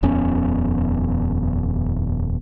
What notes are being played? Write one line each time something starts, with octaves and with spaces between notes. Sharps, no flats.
D#1 F2 B3 C#4